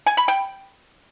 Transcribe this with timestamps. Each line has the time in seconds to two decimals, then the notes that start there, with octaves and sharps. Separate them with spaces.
0.06 G#5
0.17 B5
0.28 G5